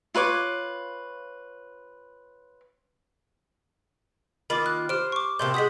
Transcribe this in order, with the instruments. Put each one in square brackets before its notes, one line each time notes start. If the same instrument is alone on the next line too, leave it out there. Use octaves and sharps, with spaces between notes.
[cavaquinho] F4 B4 C#5 D6
[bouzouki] D#3 A#3 F4 [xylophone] B5 D6
[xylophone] F#6
[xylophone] G4 F6 D7 [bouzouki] C5
[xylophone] C#6 D6
[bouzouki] A2 C3 A#3 [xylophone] C6 G6
[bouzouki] G#3 F#4 [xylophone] D#6 G6 B6